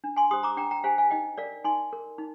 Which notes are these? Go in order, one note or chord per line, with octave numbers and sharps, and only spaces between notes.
D4
G#5 C6
G4 C5 C6 D#6
A#5 D6
D4 G5 A#5
G5 A#5
G4 C5 F5 G#5
F5 G#5
D#4 D#5 G5
A#4 D5 F5
D#4 G#5 C6
A#4
D#4